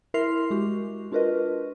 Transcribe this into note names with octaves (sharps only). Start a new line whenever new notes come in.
E4 A#4 E5 C6 C7 F7
G#3 F#4 G4
D4 F4 F#4 A#4 B4 D#5